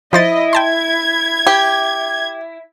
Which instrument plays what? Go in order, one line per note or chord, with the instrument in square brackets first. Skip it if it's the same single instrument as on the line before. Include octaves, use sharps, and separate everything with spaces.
[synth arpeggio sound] F3 C5 A6 [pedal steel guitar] E4 [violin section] D#5
[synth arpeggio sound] G5 A5 C6 [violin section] G#6
[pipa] G4